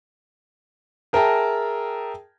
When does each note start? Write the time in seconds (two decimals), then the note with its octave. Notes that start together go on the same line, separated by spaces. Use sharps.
1.13 G#4 A#4 E5 G5 A5 A#5